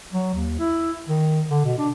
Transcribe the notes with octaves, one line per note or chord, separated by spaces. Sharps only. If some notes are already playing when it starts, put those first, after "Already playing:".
F#3
D#2
E4
D#3
D3
B2
D4